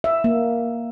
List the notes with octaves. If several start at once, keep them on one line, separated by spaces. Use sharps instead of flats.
E5
A#3